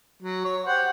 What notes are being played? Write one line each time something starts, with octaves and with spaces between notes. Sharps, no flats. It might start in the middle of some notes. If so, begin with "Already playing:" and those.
F#3
C#5
G4 C5 F#5